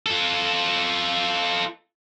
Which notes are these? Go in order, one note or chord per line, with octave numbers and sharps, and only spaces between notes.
F4 A4